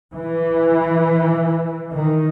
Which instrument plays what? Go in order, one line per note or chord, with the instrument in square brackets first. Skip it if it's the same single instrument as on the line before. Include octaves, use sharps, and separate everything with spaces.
[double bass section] E3
D#3